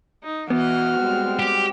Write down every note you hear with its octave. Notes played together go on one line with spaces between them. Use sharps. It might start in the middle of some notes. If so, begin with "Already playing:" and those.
D#4
E3 B3 F#4 D#5 F6
G3 G#3 C4
G4